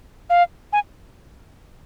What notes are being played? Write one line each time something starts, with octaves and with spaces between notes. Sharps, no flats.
F5
G#5